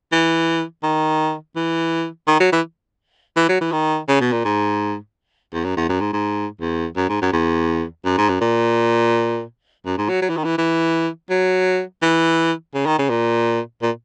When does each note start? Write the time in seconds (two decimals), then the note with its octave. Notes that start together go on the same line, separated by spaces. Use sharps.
0.12 E3
0.83 D#3
1.56 E3
2.28 D#3
2.40 F#3
2.52 E3
3.37 E3
3.49 F#3
3.61 E3
3.72 D#3
4.09 C#3
4.21 B2
4.32 A#2
4.45 G#2
5.53 E2
5.65 F#2
5.77 E2
5.89 F#2
6.01 G#2
6.13 G#2
6.61 E2
6.97 F#2
7.09 G#2
7.22 F#2
7.33 E2
8.05 F#2
8.18 G#2
8.29 F#2
8.41 A#2
9.86 F#2
9.98 G#2
10.09 F#3
10.22 F#3
10.30 E3
10.37 D#3
10.44 E3
10.58 E3
11.30 F#3
12.02 E3
12.75 C#3
12.86 D#3
12.99 C#3
13.10 A#2
13.82 A#2